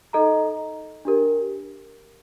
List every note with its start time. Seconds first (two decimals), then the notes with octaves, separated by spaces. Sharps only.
0.13 D#4 A4 D#5 A#5
1.05 D4 G4 A#4